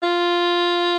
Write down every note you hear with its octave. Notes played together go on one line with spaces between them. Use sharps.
F4